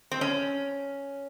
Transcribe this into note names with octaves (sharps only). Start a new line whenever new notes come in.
C4
C#4